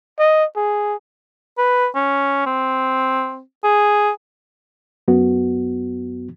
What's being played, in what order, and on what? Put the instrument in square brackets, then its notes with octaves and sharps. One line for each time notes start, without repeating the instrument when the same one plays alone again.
[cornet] D#5
G#4
[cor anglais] B4
C#4
C4
G#4
[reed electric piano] F#2 B3 F#4